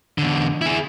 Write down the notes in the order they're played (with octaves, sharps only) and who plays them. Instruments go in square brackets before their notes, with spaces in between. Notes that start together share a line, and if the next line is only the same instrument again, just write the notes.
[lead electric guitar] E2 D3
E4 G#4